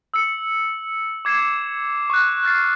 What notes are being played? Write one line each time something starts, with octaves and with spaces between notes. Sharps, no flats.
E6 C#7
D6 G#6 C7 E7
C#6 F#6
F6 F#6 A6 C7